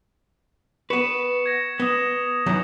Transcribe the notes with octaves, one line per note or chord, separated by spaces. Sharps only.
B3 B4 C#6 C#7 E7
G#6 A#6
B3 D#6 E7 G7
F#2 D#3 E3